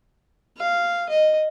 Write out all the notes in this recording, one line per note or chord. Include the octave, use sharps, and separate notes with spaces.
F5
D#5